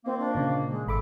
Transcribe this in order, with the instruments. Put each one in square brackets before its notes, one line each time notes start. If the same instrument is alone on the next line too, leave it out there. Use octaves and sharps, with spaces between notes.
[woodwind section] D#3 F3 A#3 [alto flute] C4
[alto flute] D4
[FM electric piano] A#2 C#3
[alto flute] G#3
[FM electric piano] G#1 B5 D6 [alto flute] A4